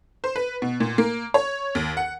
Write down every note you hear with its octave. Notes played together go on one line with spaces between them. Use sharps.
C5
B4
B2
A#2
A#3
C#5
D#2
F#5